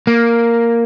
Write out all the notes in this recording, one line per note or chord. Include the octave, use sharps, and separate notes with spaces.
A#3